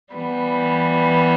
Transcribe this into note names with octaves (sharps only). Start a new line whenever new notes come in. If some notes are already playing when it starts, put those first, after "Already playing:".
E3 G3 B3